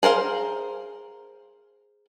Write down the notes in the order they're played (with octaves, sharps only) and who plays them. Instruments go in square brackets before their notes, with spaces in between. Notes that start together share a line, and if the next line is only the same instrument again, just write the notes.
[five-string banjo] G#4 A#4 C5 F5